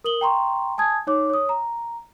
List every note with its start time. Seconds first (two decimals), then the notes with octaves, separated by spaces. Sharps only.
0.04 A#4 D#6 F#7 G7
0.21 G5 A#5 C6 C#6
0.78 G#5 A5 D#6 G#6
1.07 D#4 C#5 D6
1.30 C#5 D#6
1.49 A#5